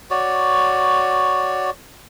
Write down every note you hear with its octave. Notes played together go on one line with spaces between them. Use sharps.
F#4 C#5 D5